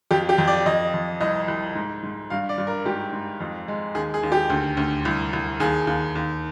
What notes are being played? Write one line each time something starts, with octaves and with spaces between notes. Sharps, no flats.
F2 G4
G4
F2
D5
F2 D#5
F2
C2 D#5
C2
G#2
G#2
G2 F5
D5
G2
A#4
G#2 G4
G#2
F2
G#3
D#2 G#4
G#4
D#2
G4
D2
D2
C2
C2
D#2 G#4
D#2
D#2